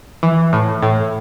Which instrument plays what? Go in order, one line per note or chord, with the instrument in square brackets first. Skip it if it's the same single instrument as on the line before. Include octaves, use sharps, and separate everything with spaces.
[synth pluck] E3
A2
A2